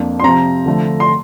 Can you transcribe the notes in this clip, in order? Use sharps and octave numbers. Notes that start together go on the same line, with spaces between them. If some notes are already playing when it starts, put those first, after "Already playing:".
Already playing: F2 A#3 D4
C6
C3 F3 C4 A#5
D3 F3 A3
C6